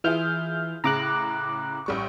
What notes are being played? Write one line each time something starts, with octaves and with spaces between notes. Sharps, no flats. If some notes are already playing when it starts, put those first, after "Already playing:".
E3 E4 F4 G#4 F6 G6
A2 C#3 A#5 D6 F#6 A#6
A1 G3 C#6